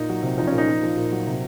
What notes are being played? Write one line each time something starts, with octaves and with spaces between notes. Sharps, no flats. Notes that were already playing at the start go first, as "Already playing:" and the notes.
Already playing: A#2 D#4
F#3
C3
F3 D#4
A#2 C#4
D#4
F3
F3
A#2
F#3
C3